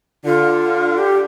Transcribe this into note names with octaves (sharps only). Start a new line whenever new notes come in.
D3 F4
G4